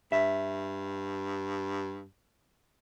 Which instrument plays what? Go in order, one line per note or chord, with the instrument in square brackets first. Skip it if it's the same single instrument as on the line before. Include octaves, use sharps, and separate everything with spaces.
[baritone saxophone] G2 [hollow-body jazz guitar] E5